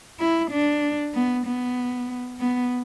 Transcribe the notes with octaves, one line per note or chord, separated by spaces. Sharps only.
E4
D4
B3
B3
B3